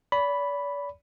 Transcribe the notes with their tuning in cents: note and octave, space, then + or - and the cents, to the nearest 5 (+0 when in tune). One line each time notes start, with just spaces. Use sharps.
D5 -40 B5 +0